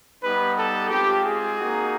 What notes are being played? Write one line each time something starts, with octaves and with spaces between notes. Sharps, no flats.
G3 B3 D#4 G4 B4
A4
G#3 C4 F4 G4
G#4
A#3 D#4 F#4